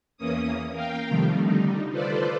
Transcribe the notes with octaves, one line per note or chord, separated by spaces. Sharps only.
E2 E3 A#3 C#4 D#6
A#4 F5 G5
C3 D#3 F3 G3 A3
D3 G3 D#4
F4 A4 B4 C5 D5